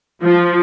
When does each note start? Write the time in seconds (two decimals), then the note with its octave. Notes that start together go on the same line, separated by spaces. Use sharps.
0.22 F3